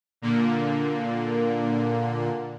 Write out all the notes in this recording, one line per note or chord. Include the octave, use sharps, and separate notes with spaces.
A#2 D3 A#3